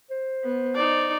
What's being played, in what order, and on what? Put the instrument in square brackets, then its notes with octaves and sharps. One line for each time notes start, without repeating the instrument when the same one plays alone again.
[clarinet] C5
[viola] B3
D#4 D5